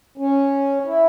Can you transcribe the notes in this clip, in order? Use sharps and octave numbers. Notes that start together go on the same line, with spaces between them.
C#4
E4